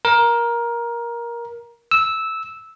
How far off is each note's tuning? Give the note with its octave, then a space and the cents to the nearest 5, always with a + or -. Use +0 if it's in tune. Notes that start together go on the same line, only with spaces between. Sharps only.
A#4 +15
E6 -10